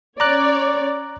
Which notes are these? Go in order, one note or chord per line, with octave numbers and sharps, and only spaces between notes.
C#4 C#5 D5 A#5 D6 F#6